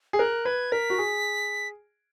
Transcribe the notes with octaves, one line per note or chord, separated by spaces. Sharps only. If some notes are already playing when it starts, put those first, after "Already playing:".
G#4
A#4 F#6
B4 G#6
A#4 B6
F#4
G#4